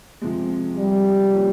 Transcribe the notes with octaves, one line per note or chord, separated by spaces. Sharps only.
C3 F3 G#3
G3
F3 A#3 C#4 G4